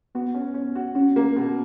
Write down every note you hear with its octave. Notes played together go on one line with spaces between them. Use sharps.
B3 F#4
C#4
C#4
F#4
C#4 F#4
A#3
B2